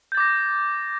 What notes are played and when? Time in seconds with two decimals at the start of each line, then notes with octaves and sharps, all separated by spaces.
0.12 G6
0.15 A6
0.17 D6
0.20 A#6